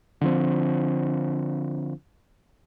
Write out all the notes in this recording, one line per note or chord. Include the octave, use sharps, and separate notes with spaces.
D3 F3 C4